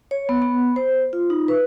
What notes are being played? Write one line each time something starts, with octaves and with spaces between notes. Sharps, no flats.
C#5
B3
B3
C5
F4
D#4
B4